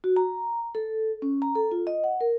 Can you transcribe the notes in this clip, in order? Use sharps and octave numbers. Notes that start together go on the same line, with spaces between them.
F#4
A#5
A4
C#4
A#5
A4
F4
D#5
F#5
A#4